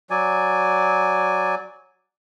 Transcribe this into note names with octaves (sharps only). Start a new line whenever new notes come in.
F#3 D5 G#5